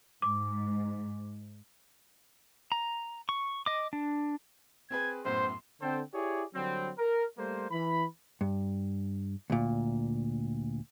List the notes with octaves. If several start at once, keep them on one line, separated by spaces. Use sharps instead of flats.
G#2 D6
A#5
C#6
D#5 D6
D4
C4 G#4 B4 G#6
F#2 A2 B3 C5 C6
D3 C4 A4 C5 G5
E4 G4 G#4 C#5 D5
D3 F#3 G3 C4
A#4
G3 A3 A#3 C5
E3 B5
G2
D2 A#2